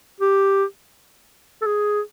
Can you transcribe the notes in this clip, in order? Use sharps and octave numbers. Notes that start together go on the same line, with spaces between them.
G4
A4
G#4